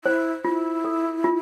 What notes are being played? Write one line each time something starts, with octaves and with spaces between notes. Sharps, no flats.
E4 C5
E4 F4
A4
F4